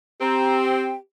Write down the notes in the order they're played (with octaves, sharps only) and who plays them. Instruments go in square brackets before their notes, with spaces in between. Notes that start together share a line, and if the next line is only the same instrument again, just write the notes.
[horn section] C4 [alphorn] G4 [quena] A#5
[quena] G5